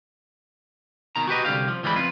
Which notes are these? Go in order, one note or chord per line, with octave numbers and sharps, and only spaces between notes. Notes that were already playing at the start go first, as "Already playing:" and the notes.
B2 D#3 A#5
F#4 G4 B4 D#5
C2 D3 G4 F5
F3
C#2 E3 G3 G#3 B5
F2 F4 B4